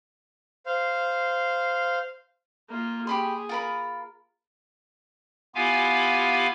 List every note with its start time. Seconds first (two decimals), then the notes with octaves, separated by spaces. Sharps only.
0.66 C5 F5
2.69 A#3 F4
3.07 G4 G#4 B5 C6
3.49 F4 A#4 B5
5.55 B3 E4 F4 G4 F5 G#5